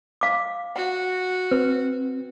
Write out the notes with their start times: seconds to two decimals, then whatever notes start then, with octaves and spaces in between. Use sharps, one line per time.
0.21 F5 D6
0.76 F#4 F#5
1.51 C4 B4